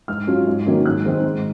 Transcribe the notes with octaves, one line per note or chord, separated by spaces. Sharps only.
G#2 F6
F#3 C#4 F4
G#2
D#3 F#3 A#3 C#4
G#2 F#6
D#3 G#3 C4
G#2